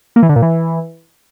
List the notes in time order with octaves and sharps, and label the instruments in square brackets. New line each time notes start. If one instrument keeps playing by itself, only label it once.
[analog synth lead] A#3
E3
D3
A#2
E3